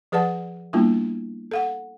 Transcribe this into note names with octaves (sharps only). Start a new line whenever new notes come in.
F3 G#4 B4 D5 F#5 A5
G3 A#3 B3 D4 E4 F4
A4 F5 F#5